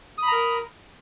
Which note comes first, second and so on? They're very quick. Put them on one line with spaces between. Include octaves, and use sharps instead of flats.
D#6 B5 A#5 A#4